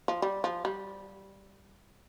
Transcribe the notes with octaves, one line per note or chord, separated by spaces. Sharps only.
F3
G3
F3
G3